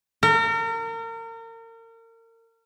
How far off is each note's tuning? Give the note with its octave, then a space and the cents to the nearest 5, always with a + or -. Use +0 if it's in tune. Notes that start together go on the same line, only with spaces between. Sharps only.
A#4 -35